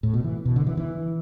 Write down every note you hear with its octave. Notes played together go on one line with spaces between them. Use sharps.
A2
B2
E3
B2
D3
E3
E3